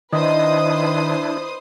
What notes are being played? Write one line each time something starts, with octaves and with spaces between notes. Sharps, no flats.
D#3 D4 E4 B4 C5 D#5 D#6